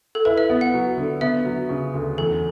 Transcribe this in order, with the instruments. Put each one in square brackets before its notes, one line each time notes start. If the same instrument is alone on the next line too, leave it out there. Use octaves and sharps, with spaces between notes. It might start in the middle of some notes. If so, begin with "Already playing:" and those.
[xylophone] A4
[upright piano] E4 [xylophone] B4
[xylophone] E5
[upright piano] B3
[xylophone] F#5
[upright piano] F#3
D3
[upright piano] B3 [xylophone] E5
[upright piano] F#3
C#3
D2
[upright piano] E2 [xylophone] A4